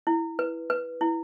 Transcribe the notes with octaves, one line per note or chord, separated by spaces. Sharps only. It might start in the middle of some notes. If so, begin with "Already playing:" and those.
E4
B4
B4
E4